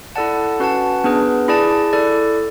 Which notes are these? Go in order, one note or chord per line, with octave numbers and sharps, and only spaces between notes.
E4 A4 D5 F#5 A5
C#4 F#4 B4 F#5 A5
B3 D4 G#4 B4
E4 G#4 D5 A5
E4 A4 D5